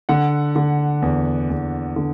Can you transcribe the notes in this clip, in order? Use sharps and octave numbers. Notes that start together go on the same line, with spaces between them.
D3 F#5
D3
E2
E2
D3